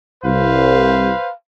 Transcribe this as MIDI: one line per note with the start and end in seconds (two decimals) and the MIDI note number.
0.24 1.10 36
0.24 1.31 71
0.24 1.31 72
0.24 1.31 77